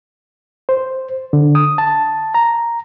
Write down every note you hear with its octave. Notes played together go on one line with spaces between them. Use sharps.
C5
D3
D#6
A5
A#5